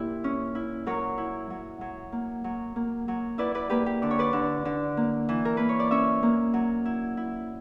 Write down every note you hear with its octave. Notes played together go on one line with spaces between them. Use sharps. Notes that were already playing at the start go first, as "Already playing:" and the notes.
Already playing: A#2 E4 G4
C#4
E4
F#3 A#4 C#5
E4
F#3
F#3
A#3
F#3
A#3
F#3
E4 B4 D5
B4 D5
A#3 G4 B4
G4
D3 D5
C#5
B4 D5
D3
D3
A#3
E3
A#4
A#3 B4
C#5
D5
C#4 C#5 E5
A#3
F#3
E4
E4